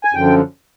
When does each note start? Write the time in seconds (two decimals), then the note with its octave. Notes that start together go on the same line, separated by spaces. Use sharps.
0.04 G#5
0.14 F#2 D3 F3 G5